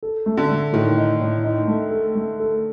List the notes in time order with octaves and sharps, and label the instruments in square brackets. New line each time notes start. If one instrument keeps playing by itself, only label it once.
[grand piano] A4
A3
[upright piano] D3
[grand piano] A3
[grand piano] A2 [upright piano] D#3
[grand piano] D#4
A2
D#4
A3
A4
A3
A4